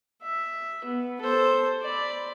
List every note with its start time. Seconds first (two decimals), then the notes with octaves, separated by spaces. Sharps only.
0.23 E5
0.85 B3
1.21 A4 C5
1.83 D5 B5